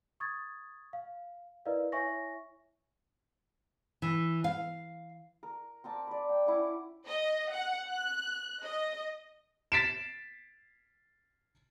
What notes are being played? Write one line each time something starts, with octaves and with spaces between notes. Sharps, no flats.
C#6 D#6 G#6 A6
F5
E4 A#4 B4 D5 D#5 F5
E4 C#5 E5 G#5 C#6 A#6
E3
F5
A#4
C4 A#4 A5 D6
D5 B5
G5
C#4 E4 F#5 D6
D#5
F#5
F#6
D#5
A6 B6 C7 D7 E7